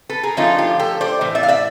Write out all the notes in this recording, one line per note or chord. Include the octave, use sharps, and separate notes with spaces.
A4 B4
G#4 A#4
D3 F3 A3 C#4 D#4 F4
F4 G4
G4 A4
C5 D5
A2 E3
D5 E5
F5
D5 E5